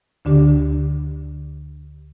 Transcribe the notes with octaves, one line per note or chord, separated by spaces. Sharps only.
D2 D3 D4 G4